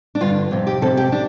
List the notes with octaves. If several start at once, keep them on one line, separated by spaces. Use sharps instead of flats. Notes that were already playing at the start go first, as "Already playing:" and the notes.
D4
G2 D3 F4
F2 C3
G4
F2 C3 A4
G4
D4